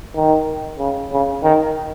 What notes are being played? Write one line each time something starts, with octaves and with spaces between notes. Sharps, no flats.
D#3
C#3
C#3
D#3